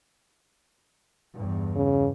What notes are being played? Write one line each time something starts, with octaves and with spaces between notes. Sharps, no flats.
E2 G2
C#3